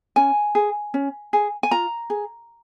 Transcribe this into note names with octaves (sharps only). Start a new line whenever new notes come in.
C#4 G#5
G#4
C#4
G#4
G#5
F4 A#5
G#4